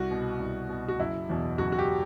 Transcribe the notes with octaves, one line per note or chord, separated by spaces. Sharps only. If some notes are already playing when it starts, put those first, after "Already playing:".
Already playing: C2 F#4
B2
C2
B2
F#4
F#1 E4
E2 B2
F#1 F#4
F#4
G4